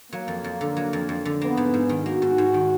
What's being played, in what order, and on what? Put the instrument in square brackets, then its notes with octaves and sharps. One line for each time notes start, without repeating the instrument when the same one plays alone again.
[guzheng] F#3 [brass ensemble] A#3
[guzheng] F2
F2
D3
F#3
F2
F2
D3
[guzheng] A#3 [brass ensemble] B3
[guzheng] G#2
G#2
D#3
[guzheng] A#3 [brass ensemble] F#4
[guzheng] G#2
G#2
D#3